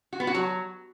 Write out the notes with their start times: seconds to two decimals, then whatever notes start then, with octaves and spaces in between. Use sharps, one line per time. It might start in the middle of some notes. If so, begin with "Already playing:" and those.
0.13 F#4
0.20 B3
0.27 F#4
0.35 F#3